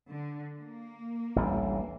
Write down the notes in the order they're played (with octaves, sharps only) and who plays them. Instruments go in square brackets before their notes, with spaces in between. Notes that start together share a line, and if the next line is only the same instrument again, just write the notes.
[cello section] D3
A#3
[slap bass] A1 D2 G3